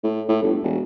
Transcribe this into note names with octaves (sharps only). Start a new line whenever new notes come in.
A2
A2
G1
E1